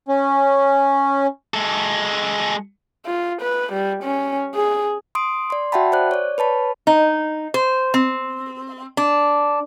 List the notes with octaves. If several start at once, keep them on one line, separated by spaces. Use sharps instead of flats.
C#4
G#3 A4
F4
B4
G3
C#4
G#4
C6 D#6 D7
D5 C6
F#4 E5 F#5 G5 A5 B5
C5 D5 F#6
C#5 D5
B4 C#5 A5 B5
D#4
C5
C4
D4